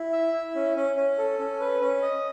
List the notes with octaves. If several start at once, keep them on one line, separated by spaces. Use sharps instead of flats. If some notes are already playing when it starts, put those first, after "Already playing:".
Already playing: E4
E5
E4
C#4
C#4
C#4
A4
C#4
B4
C#4
D#5